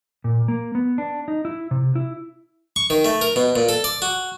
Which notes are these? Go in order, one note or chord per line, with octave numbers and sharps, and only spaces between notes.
A#2
A#3
B3
D4
D#4
E4
C3
E4
C#6
D#3
A3
A#4
B2
A#2
A4
D5
F#4